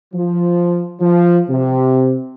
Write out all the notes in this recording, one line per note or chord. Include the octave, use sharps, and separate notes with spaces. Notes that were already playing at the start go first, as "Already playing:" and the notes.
F3
F3
C3